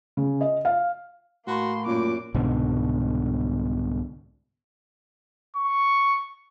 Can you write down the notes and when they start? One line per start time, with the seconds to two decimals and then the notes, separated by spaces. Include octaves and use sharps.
0.17 C#3
0.41 D#5
0.65 F5
1.47 A2 A#3 F#4 C6
1.86 F#2 A#2 D6
2.34 C2 G#2 B2 D3
5.56 C#6